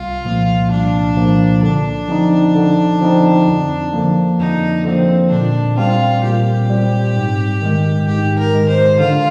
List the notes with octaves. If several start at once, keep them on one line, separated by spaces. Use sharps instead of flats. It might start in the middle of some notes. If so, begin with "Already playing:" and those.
Already playing: C2 F4
A#2 F3 A#3
C2 D4
A#2 F3 A#3
D3 D4
F3 C4 D#4
D3
F3 C4 D#4
F2
D3 F3 A#3
F2 D#4
D3 F3 A#3 C4
A#2 D4
G3 C4 F4
A#2 G4
G3 C4
G#2
D#3 G#3
G#2 G4
A#4
D#3 G#3
C5
D3 F4